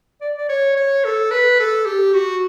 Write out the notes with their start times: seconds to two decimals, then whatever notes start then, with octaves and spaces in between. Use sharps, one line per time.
0.21 D5
0.38 D5
0.49 C#5
0.77 C#5
1.05 A4
1.31 B4
1.60 A4
1.86 G4
2.14 F#4